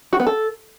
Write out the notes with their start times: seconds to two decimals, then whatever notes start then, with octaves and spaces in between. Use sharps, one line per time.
0.13 F#4
0.20 B3
0.27 A4